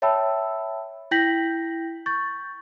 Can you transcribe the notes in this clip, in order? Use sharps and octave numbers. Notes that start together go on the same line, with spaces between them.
C#5 E5 G5 A5 B5 E6
E4 G5 G6 A#6 B6 F#7
C#6 G6 A6